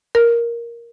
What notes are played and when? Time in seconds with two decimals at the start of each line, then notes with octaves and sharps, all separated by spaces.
0.15 A#4